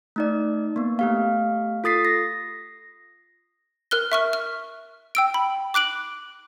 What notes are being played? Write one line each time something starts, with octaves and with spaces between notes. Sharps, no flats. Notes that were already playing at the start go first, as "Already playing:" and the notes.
A3 D#4 D5
A#3 B3
A3 G4 F5
F4 A4 D#6 A6 B6 C7
A#6
A#4 F6 F#6 G7
E5 C#6 F6
F6
G5 E6 D7
B5
D6 F#6 D7 F#7